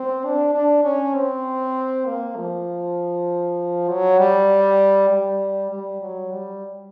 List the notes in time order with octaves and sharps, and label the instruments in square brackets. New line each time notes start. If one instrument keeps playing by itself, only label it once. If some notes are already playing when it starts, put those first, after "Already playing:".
Already playing: [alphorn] C4
D4
D4
C#4
C4
A#3
F3
F#3
G3
G3
G3
F#3
G3